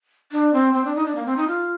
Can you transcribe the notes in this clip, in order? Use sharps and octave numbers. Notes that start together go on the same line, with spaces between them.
D4
C4
C4
D4
D#4
D4
A#3
C4
D#4
F4